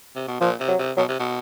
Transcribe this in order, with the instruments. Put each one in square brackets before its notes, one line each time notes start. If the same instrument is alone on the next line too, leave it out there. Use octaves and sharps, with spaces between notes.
[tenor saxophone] C3
B2
[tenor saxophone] A#2 [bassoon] F3
[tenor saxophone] C3
[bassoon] F#3
[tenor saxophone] C3
[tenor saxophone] B2 [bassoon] F#3
[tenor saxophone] C3
B2